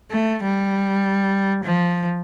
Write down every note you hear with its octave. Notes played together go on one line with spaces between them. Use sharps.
A3
G3
F3